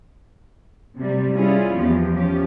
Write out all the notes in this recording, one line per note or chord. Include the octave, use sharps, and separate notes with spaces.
C3 G3
G3 C#4 E4 F4 G#4
E2 F3 G4
F3 C#4 G4